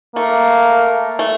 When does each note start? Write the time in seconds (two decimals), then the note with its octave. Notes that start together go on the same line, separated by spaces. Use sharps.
0.16 A3 A#3
1.19 A3